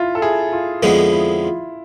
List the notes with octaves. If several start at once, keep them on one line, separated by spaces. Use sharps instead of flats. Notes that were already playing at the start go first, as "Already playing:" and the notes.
Already playing: E4 F4
A4
E4 G#4
F4
F2 D3 F3 G#3 B3 E4
E4
F4